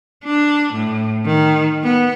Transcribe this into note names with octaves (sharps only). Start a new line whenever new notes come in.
D4
A2
D#3
B3